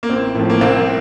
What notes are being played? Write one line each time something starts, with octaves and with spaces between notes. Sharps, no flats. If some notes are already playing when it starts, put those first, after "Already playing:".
A#3
A1 C4
A2 F3
A#3
C2 C4